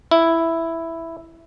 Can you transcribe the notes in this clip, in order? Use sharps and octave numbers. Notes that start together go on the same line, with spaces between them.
E4